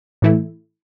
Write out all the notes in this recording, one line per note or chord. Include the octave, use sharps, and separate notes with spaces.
A2 E3 A3 E4